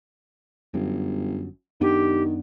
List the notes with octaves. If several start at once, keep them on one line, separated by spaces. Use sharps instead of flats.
G1 F#2
F#2 D#3 B3 D4 G4